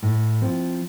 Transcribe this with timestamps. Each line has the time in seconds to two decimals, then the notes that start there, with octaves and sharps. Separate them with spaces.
0.02 A2
0.41 F3 C4